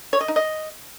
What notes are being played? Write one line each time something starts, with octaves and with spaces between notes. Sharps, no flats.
C#5
D#5
D#4
D#5